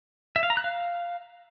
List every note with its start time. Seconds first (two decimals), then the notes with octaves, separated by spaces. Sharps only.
0.36 E5
0.43 F5
0.50 A#5
0.57 F#6
0.64 F5